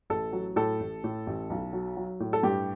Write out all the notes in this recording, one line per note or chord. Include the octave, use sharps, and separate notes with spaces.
A1 A4
F#3
A2 A4
A1
A2
A1
B1
F#3
F#3
A2
A4
G2 G4